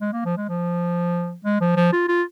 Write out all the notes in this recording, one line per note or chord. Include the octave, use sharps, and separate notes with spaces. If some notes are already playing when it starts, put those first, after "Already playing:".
G#3
A#3
F3
G#3
F3
G#3
F3
F3
F4
F4